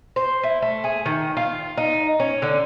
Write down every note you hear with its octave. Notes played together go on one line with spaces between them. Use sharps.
C5
E4
A3
G#4
D#3
F4
D#4
C#4
D3